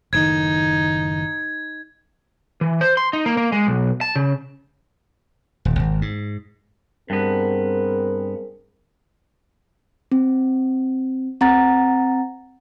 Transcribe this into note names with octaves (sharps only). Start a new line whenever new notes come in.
F#1 A2 D#3 D#4 G#6
E3
C5
C6
D#4
A#3
A#3
G#3
B1
A5
C#3
D#1
G#1
G#2
G2 B3 C4 G#4 A#4
C4
C4 F#5 A#5 A6